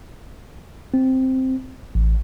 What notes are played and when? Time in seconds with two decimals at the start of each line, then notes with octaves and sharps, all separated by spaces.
0.94 C4
1.95 A1